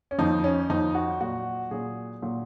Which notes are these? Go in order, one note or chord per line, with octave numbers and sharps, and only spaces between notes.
C#4
F2 F3 D#4
C#4
F2 F3 D#4
F#4
A#2 F#3 F#4
A#2 F#3 G#4
A#2 F#3